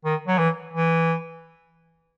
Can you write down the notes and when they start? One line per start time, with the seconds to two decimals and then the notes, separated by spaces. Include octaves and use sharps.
0.05 D#3
0.27 F#3
0.38 E3
0.73 E3